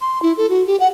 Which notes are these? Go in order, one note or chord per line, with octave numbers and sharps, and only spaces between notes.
C6
E4
A4
F#4
G4
F#5